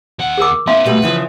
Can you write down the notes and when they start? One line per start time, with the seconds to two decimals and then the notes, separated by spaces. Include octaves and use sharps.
0.19 D#2 F#5
0.38 G#4 A#4 D6
0.67 B3 C#4 E5 F5 C6
0.86 B2 G3 A3 B4
1.02 C#3 E3 F3